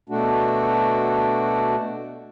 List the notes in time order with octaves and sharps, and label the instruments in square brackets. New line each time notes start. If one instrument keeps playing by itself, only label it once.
[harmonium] B2 A3 D4 F#4